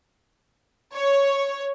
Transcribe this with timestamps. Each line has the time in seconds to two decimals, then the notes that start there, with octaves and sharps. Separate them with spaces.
0.94 C#5